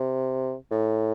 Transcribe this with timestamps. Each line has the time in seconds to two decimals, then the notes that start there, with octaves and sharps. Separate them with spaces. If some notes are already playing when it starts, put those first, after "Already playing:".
Already playing: C3
0.71 A2